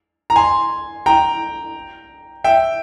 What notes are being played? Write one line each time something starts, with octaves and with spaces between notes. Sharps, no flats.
A#5
G#5 C6
G5 A#5
E5 G5